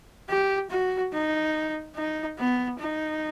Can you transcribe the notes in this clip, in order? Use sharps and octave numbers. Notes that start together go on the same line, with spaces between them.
G4
F#4
D#4
D#4
B3
D#4